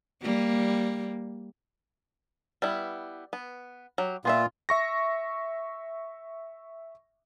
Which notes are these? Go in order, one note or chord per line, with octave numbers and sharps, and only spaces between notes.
G3 A#3
G3 B3 E4
B3
F#3 G4
A#2 B3 F4 G#4 E5
E5 C#6 A#6